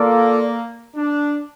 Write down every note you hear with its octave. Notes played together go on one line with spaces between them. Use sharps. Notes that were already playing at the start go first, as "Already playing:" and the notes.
Already playing: A#3 F4 A4 D5
D4